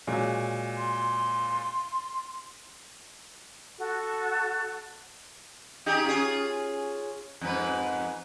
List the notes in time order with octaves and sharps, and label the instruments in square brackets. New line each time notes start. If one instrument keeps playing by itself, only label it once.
[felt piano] A#2 F#3 G#3
[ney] C6
[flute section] F#4 A4
[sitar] D#4 G4 G#4
C#4 F4 G#4
F2 G#2 B4